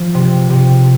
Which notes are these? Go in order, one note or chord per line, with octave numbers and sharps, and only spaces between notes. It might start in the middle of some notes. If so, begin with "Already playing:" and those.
Already playing: F3
C3
C3